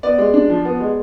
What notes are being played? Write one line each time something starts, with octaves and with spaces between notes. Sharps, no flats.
B3 D5
G#3
D4
F3
B3
G#3